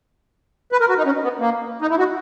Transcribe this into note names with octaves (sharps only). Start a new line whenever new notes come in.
B4
A#4
F#4
D#4
C#4
B3
A#3
D#4
E4
F#4